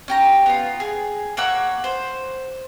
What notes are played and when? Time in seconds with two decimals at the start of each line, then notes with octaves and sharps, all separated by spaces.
0.08 C#4 G4 A#5
0.46 B3 F4
0.80 G#4
1.37 A#3 C#5 F#5 E6
1.84 C5